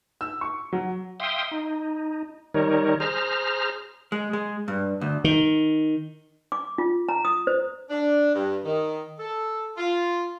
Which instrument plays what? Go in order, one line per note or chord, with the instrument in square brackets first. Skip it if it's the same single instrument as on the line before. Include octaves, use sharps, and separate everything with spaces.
[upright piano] E6
C#6
F#3
[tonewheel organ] E5 F5 G5 C6 D#6
D#4
D#3 G3 D#4 A#4 C#5
G#4 C5 A#5 F6
[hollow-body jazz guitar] G#3
G#3
G2
D2
[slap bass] D#3
[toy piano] D6
F4
A#5
D#6
C5
[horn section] D4
G2
D#3
A4
F4